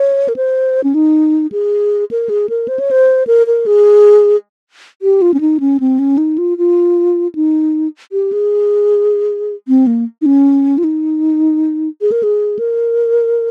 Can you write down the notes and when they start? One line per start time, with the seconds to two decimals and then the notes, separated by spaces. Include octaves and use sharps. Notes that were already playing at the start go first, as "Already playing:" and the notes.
Already playing: C#5
0.28 A#4
0.36 C5
0.84 C#4
0.94 D#4
1.52 G#4
2.11 A#4
2.29 G#4
2.49 A#4
2.68 C5
2.79 C#5
2.91 C5
3.27 A#4
3.47 A#4
3.66 G#4
5.02 G4
5.22 F4
5.34 C#4
5.40 D#4
5.60 C#4
5.80 C4
5.99 C#4
6.18 D#4
6.38 F4
6.58 F4
7.35 D#4
8.12 G4
8.32 G#4
9.68 C4
9.87 A#3
10.22 D#4
10.26 C#4
10.78 F4
10.84 D#4
12.01 G#4
12.12 A#4
12.23 G#4
12.59 A#4